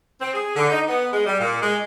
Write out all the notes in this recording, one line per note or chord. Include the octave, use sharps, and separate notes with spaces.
C4
G#4
D3
D#4
B3
G#3
G3
A#2
G#3